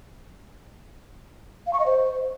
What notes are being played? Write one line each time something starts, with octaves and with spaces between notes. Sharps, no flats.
F5
C#6
D#5
C5